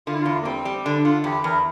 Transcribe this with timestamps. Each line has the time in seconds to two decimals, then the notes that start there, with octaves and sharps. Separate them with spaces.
0.07 D3 F4
0.14 E4
0.21 E2 F4
0.42 A#3
0.45 G3 C4
0.65 G3
0.85 D3 D4
1.04 D3 F4
1.24 E2 G4
1.44 E2 A#4